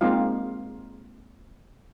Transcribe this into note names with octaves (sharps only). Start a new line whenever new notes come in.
G#3 A#3 C4 D#4 F4 F5